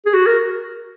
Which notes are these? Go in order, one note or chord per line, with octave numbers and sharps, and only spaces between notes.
G#4
F#4
A#4